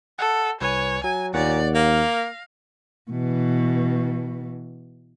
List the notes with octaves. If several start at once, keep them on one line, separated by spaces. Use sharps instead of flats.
A4 F#5
C2 B4 C#5 G#5
F#3 G#5
D#2 A#2 C#5 D5 F#5
A#3 F5
A#6
B2 E3